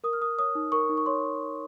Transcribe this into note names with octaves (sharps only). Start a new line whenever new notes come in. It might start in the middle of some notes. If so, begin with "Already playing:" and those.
A#4 D#6
F6
A#4 D#6
C#5 D#6
D#4
A#4 C#6
D#4
C#6
C#5 C6